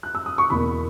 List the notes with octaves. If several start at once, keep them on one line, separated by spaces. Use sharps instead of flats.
F#6
E6
D#6
C#6
E2 B2 A#3 B5